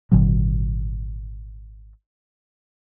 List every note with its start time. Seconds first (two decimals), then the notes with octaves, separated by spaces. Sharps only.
0.12 G#1 A#2 D3 F#3